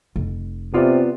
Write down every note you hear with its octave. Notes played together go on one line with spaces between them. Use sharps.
F1
C3 B3 F4 D5